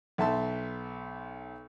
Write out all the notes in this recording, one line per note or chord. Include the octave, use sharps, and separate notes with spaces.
B1 E5 A5 C6